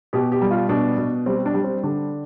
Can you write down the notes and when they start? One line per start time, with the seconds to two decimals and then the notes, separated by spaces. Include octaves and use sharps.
0.13 B2 G4
0.32 G4
0.42 G3
0.51 F4
0.69 B2 D4
0.98 B2
1.26 G3 C4
1.46 D4
1.54 G3
1.64 C4
1.83 D3 D4